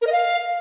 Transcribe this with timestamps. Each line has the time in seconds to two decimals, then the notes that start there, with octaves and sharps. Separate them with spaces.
0.01 A#4
0.07 D#5
0.12 F5